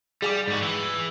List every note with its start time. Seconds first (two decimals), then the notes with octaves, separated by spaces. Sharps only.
0.22 G3 G#4 G#5 D6
0.48 G#2 F#4
0.62 E3